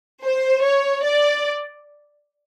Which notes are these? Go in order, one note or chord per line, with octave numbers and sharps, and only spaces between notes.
C5
C#5
D5